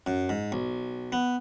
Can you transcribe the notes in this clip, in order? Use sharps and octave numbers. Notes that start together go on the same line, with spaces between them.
F#2
G#2
B1
B3